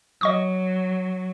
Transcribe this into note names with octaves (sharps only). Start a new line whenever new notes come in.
F#3 D#5 C#6 D#6